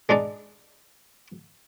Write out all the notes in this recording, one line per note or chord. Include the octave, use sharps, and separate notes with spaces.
G#3 D4 D#4 D5